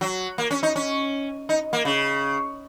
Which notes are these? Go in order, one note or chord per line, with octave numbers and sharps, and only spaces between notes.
F#3
A#3
C#4
D#4
C#4
D#4
A#3
C#3